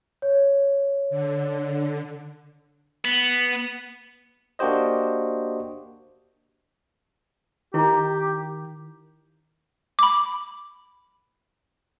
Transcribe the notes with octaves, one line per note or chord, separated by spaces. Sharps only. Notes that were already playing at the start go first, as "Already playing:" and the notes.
C#5
D3
B3
A#3 D4 F#4 G4 C5 D#5
D#3 E4 G4 A#4 A#5
B5 D6